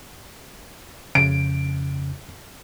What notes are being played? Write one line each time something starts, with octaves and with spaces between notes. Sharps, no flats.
F2 C#3 D7